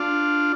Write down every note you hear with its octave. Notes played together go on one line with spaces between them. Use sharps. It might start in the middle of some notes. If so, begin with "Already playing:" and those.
Already playing: D4 F4